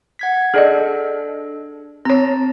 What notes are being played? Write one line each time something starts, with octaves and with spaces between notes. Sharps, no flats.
F#5 G#6 B6
D4 G#4 A4 D5 D#5
C4 C#5 A5 A#5